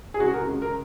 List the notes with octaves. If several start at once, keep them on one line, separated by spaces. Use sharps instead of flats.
G#4
C#2 F#4
A#4
C#2
A#4